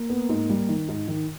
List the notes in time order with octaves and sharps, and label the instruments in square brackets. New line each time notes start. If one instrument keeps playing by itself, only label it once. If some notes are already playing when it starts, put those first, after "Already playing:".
Already playing: [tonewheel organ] A#3
[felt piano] B3
G#2
G3
D#3
G#2
D#3